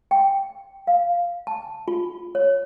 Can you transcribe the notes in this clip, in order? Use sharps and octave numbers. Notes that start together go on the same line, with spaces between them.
G5
F5
A5
F4
C#5